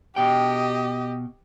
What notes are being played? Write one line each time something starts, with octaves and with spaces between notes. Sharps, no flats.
B2 G4 D#5 G5